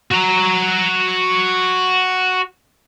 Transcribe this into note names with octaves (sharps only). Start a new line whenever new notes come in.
F#4 A#5